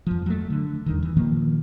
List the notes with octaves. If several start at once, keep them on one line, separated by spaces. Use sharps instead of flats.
F2 F3
F#3 A3
D3
E2 G2 D#3
E3
A#2 D#3 F3 A#3